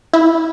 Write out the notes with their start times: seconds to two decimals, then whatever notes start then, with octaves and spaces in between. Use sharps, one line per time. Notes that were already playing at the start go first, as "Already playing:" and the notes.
0.13 E4